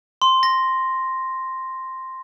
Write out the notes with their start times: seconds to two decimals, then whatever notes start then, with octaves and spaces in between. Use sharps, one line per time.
0.22 C6
0.43 A#6